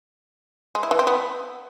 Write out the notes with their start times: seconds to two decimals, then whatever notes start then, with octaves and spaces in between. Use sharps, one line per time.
0.75 G#3
0.83 E4
0.91 E3
0.99 C4
1.07 B3